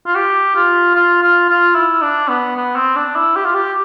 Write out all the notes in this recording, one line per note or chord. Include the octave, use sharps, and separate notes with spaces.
F4
G4
F4
F4
F4
F4
E4
D4
B3
B3
C4
D4
E4
G4
F4
G4